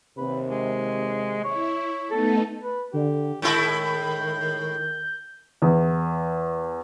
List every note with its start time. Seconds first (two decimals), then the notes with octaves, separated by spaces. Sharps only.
0.17 D#2 C3 B4
0.51 G#3
1.44 E4 C#5
2.09 A3 B3 D#4 A4
2.62 B4
2.93 D3 G4
3.42 A2 D#3 G#3 E4 G6
5.62 E2